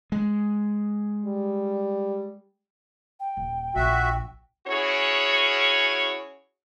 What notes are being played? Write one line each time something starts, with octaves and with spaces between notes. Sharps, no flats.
G#3
G3
G5
D#1
A#1 F#4 E5
C#4 E4 F#4 G#4 C#5